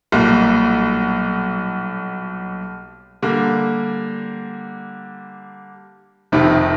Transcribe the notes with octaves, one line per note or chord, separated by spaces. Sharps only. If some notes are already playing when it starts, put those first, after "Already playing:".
B1 A#2 G3 A#3
D3 G3 A#3
F1 F2 C3 D#3